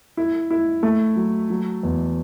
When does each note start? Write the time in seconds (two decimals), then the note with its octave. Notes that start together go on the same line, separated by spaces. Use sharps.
0.17 E4
0.51 E4
0.83 A3
1.16 F#3
1.50 F#3
1.83 E2